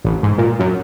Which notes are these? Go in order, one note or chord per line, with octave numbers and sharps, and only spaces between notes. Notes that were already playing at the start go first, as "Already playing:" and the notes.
A1
G#2
A#2
F#2